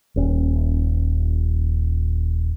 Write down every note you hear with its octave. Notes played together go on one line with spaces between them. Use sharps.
D#1 C#4